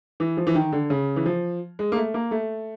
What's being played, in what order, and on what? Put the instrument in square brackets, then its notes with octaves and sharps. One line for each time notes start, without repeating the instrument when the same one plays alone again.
[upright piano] E3
F3
E3
D#3
D3
C#3
E3
F3
G#3
A#3
A3
A#3
A3